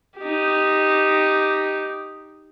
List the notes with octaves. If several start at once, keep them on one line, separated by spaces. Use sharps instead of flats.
D#4 G4